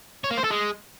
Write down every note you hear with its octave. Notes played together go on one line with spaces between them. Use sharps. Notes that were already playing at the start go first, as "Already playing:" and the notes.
C#5
A#3
C5
A4
G#3